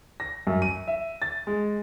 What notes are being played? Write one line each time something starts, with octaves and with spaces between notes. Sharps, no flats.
A#6
F#2
D#7
E5
A6
G#3